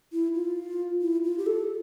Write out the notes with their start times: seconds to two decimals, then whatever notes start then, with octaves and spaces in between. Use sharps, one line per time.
0.13 E4
0.35 F4
1.02 E4
1.24 F4
1.38 G4
1.46 A4